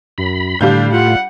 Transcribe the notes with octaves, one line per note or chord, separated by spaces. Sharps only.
F#2 B5
A2 D3 G3 D4 F5 G6
F4 F#5